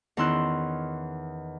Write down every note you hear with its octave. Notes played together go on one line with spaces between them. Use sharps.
E2 D#3 C#4 C6 E6 F#6